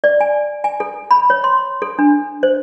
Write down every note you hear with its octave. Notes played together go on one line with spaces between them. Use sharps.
D5
G#5
G#5
A4
B5
C#5
C6
A4
D4
C5